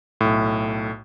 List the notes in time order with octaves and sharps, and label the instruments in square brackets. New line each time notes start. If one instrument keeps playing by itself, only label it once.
[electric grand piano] B1 A2